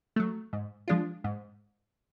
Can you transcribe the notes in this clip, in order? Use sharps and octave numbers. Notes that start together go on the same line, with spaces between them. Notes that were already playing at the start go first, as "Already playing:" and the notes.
F#3 A3
G#2
F3 G#3 D4 F4
G#2